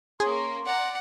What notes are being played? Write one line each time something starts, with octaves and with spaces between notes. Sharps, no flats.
A#3 C#4 G#4 C6
D5 F#5 A#5